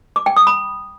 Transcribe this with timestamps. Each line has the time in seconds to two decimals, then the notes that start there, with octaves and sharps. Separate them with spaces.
0.16 D6
0.26 G5
0.37 D#6
0.47 B5